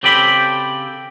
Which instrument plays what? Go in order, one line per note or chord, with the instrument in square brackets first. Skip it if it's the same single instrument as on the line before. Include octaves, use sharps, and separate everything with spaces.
[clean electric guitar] C#3 C4 G4 A4 G5 B5